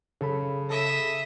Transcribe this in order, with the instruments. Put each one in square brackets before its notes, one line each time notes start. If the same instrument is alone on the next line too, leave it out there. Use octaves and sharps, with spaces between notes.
[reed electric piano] F#2 A4 B5 [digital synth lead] C#3
[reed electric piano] A4 B5 [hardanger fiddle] D#5 E5